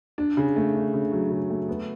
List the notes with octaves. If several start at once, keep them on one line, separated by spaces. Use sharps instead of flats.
D4
C#3
A3
D4
C#3
F#3
C#3
A3
B3